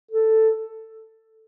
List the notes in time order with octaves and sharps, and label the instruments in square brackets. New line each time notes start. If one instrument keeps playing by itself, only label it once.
[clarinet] A4